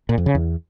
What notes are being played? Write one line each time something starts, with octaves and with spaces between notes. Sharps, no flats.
A#2
F2
C#3
E2